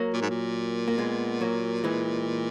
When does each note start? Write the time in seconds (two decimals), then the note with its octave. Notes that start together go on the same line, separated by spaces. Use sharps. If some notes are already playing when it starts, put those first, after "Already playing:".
Already playing: F#3 A#3
0.13 A#2
0.21 G#2
0.30 A#2
0.88 A#3
0.98 G#3 B3
1.41 F#3 A#3
1.84 E3 G#3